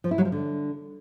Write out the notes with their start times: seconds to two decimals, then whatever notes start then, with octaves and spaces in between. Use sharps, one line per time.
0.04 F3
0.11 E4
0.18 F#3
0.25 F3
0.32 D3